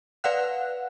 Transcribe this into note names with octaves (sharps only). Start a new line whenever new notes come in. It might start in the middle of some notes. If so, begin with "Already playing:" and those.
B4 D5 F5 F#5 F#6